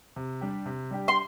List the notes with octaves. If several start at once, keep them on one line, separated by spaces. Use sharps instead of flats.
C3
G3 D4 G4
C3
G3 D4 G4
C6